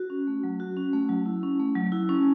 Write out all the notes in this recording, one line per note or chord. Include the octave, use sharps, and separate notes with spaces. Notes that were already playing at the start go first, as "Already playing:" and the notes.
Already playing: F#4
C#4
A3
F#3
F#4
C#4
A3
F#3
E4
C#4
A3
F#3
E4
C#4